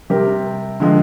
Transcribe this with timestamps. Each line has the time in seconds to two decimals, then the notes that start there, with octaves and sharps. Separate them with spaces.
0.10 C3 G3 C4 G4 A#4
0.80 D3 F3 G#3